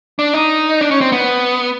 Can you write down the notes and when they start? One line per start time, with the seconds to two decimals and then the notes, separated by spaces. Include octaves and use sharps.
0.19 D4
0.34 D#4
0.81 D4
0.91 C#4
1.01 C4
1.12 B3